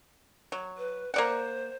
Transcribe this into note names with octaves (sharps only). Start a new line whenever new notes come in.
F#3
B4
A#3 C5 D5 F#5